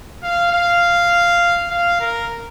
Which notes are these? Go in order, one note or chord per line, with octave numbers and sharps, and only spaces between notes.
F5
F5
F5
A#4